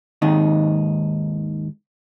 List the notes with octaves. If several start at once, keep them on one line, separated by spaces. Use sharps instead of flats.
D#2 G#2 D#3 D#4